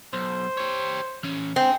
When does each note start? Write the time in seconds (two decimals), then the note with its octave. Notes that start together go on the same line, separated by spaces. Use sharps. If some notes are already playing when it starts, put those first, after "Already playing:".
0.13 B1 C5
0.57 G4 C#5
1.23 E3 C#4
1.56 C4 D#5 G#5